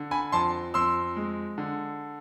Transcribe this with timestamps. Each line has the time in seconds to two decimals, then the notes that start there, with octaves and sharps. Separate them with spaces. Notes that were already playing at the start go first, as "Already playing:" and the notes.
Already playing: D3
0.11 G#5 B5
0.32 F2 A5 C6
0.74 F2 C6 E6
1.16 G#3
1.58 D3